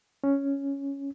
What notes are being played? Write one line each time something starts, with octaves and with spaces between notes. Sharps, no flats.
C#4